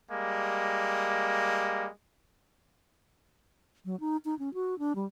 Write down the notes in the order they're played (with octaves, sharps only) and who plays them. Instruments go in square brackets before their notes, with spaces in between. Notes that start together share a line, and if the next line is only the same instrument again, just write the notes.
[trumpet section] G3 G#3 A#3
[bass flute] F#3
D#4
D#4
C#4
F#4
D4
G3